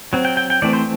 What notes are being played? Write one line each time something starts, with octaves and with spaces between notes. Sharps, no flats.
F#3 C4
G5
G5
G5
E3 A3 C4 D5
C5